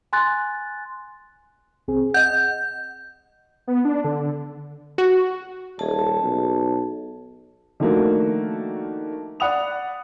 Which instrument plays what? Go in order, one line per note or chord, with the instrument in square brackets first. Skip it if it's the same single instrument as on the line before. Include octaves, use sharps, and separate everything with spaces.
[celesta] G#5 C6 F#6 A6
[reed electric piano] C2 C4 G#4
[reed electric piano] D#5 F#5 [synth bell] G6
[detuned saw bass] B3
D4
D3
[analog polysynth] F#4
[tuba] D#1 [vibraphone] G#4 A5
[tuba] B1
[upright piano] D#3 F3 A3 A#3 D4 F#4
D5 F#5 B5 D#6 F7